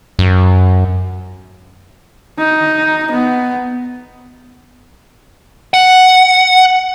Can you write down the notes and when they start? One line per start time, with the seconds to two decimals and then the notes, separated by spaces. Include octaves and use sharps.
0.19 F#2
2.38 D#4
3.12 B3
5.74 F#5